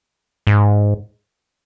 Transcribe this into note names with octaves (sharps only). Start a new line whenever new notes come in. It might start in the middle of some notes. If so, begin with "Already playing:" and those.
G#2